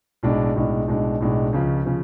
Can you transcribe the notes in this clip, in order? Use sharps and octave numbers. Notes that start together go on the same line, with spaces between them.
B1 A2 G#3 D4
B1 A2 G#3 D4
B1 A2 G#3 D4
B1 A2 G#3 D4
C#2 C#3 F3
C#3 F3